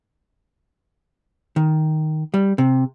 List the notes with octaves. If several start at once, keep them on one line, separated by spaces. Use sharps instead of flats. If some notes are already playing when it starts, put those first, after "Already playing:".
D#3
G3
C3